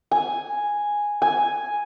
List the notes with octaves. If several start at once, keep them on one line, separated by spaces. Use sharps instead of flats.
G#5
G#5